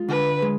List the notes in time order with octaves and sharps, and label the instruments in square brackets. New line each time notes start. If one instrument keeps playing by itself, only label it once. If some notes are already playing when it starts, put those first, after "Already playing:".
Already playing: [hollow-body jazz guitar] G#3 F4
[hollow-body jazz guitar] D3 [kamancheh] B4
[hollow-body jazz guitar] G#3